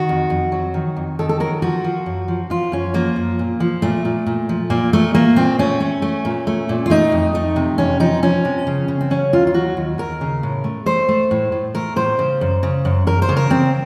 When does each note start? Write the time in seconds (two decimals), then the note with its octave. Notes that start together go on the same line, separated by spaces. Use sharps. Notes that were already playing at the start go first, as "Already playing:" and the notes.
Already playing: D#3 F#4
0.09 F2
0.30 F2
0.52 F#3
0.74 D#3
0.96 F2
1.19 D#3 A4
1.29 A4
1.40 F#3 A#4
1.62 F3 F#4
1.84 F3
2.06 F#2
2.28 F3
2.50 F3 F4
2.72 F#2 C#4
2.94 F3 A#3
3.16 F#2
3.39 A#2
3.60 F3
3.82 A#2 A3
4.05 A#2
4.26 A#2
4.49 F3
4.70 A#2 A#3
4.93 A#2 A3
5.15 A3 A#3
5.36 A#2 C4
5.59 A3 C#4
5.80 A3
6.02 A3
6.25 A#2
6.47 A3
6.69 A#2
6.86 F4
6.90 A3 D#4
7.12 F2
7.35 A3
7.56 C3
7.78 F2 C#4
8.00 F3 D#4
8.22 F3 C#4
8.45 C3
8.67 C#3
8.88 C#3
9.01 C4
9.10 F#3 C#4
9.33 D#2 F4
9.47 F4
9.54 F#3 F#4
9.77 D#2
9.98 D#2 A#4
10.21 C#3
10.43 A2
10.64 A3
10.86 A3 C5
11.09 A3
11.31 A2
11.52 A2
11.75 A3 A#4
11.96 A2 C5
12.19 C#3
12.41 F#2
12.63 C#3
12.85 F#2
13.07 F#2 A#4
13.22 C5
13.29 C#3
13.37 A#4
13.50 C#3 C4